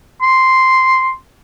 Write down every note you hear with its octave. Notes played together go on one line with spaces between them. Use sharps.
C6